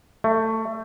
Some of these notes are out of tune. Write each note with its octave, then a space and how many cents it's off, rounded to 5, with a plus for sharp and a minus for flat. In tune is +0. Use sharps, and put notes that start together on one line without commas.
A3 +20